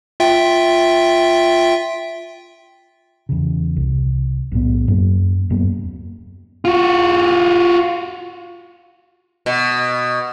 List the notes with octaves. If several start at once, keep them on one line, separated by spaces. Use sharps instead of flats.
F4 E5 G5
E2 C#3
C2
B1 E2 A2 B3
F#2 A#3
D#1 F#2 A#3 B3
F4 F#4
B2